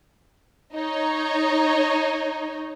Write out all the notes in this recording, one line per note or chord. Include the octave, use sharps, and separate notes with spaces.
D#4 C#5